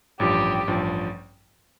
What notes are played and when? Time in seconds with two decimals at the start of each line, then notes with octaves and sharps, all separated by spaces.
0.20 A1 G2 F3 G4
0.67 A1 G2 F3